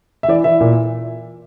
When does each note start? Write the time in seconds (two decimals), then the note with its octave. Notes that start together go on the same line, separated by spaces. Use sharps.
0.23 E5
0.28 E3 D5
0.44 E3 E5
0.60 A#2